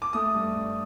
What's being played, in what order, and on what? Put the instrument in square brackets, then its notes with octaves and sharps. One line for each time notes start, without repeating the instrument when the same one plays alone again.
[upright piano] D6
A3 D#6
G2
G2